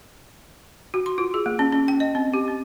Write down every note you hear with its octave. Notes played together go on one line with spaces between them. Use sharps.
F#4
C6
F4
G#4
A#3
C#4
C#4
G5
D#5
C4
G4
C4